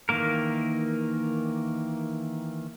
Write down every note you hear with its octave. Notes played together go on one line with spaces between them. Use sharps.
D#3 E3 A#3 A#4